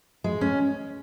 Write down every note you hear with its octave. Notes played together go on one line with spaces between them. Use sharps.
G#3
C#4